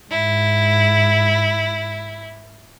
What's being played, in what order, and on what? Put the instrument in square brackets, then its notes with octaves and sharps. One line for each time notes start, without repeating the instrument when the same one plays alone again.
[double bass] G#2 [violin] E4